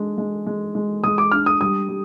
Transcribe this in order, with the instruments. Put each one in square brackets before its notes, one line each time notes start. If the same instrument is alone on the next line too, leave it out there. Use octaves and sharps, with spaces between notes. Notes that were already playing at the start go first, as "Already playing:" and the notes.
Already playing: [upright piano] G#3 D4
G#3
G#3
G#3
[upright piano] G#3 [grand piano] D#6
[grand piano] D6
[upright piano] D4 [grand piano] F6
[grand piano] D#6
[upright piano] G3 [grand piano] D#6
[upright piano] G3